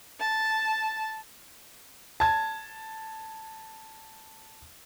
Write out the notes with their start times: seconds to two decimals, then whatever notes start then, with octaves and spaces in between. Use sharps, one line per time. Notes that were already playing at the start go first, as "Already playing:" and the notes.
0.20 A5
2.20 A5 G#6